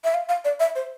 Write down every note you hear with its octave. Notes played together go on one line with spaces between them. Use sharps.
E5
F5
F5
D5
E5
C5